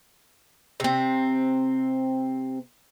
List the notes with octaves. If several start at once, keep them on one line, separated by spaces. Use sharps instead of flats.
C3 C4